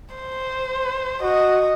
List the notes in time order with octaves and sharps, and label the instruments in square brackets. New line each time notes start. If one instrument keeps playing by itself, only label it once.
[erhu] C5
[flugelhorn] F#4 [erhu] D#5